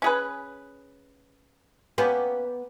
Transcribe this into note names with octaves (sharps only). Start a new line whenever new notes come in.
C#4 G#4 B4
A#3 B3 C#4 G4